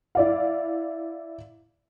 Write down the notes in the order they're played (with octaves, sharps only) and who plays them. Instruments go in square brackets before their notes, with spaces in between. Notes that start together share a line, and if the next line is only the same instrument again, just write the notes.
[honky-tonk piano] E4 D5 F5